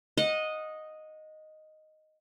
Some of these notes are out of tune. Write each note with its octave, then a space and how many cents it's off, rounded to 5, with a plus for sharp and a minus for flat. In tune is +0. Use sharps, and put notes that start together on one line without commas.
D#5 +0 F#5 -30